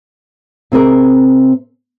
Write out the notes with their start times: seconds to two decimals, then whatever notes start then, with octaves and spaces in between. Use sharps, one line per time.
0.72 C3 C4 G#4 A#4